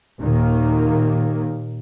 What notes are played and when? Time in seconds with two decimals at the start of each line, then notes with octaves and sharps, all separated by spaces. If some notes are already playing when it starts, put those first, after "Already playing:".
0.20 D#2 A#2 D#3 A#3